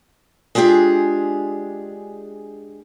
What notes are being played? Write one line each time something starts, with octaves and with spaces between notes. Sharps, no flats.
G#3 D4 F4 G4 G#4